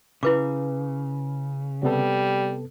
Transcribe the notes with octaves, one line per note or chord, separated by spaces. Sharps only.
C#3 E4 B4 D6
C3 G3 B3 A4